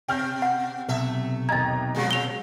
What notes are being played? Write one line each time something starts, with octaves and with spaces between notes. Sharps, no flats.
B2 G5 F6 G6
F#5
B1 C3 A3 E5
D#2 D#5 A#5 G#6 A6
F2 F3 F#3 G#3
F7 G7